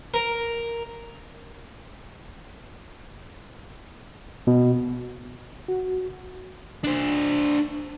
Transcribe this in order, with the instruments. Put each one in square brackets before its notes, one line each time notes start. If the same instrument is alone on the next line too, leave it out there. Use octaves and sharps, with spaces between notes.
[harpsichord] A#4
[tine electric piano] B2
[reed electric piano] F#4
[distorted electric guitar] D4 C5